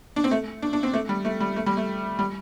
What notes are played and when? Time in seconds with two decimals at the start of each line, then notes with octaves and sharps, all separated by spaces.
0.16 D4
0.24 C4
0.31 A3
0.62 D4
0.73 D4
0.83 C4
0.93 A3
1.09 G3
1.25 A3
1.40 G3
1.56 A3
1.66 G3
1.77 A3
2.19 G3